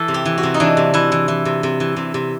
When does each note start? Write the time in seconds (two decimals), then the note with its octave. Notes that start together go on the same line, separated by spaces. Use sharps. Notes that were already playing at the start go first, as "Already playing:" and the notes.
Already playing: E3 A4
0.08 C3
0.14 G4
0.25 E3
0.38 F#4
0.43 C3
0.54 D#4
0.60 E3 D4
0.77 C3
0.94 E3 E4
1.12 E3
1.28 E3
1.45 C3
1.63 C3
1.80 E3
1.96 C3
2.14 C3